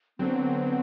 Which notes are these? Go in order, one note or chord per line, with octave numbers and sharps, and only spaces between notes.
D3 F#3 B3 C4